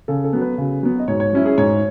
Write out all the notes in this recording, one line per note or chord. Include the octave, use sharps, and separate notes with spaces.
C#3 A4
A4
F#3 B3
B4
C#3
F#3 B3
D#5
G#2 C#5
C#5
F#3 C#4 E4
G#4
G#2 C#5